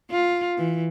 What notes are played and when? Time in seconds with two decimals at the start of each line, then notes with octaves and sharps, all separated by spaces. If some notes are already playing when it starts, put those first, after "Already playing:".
0.10 F4
0.57 E3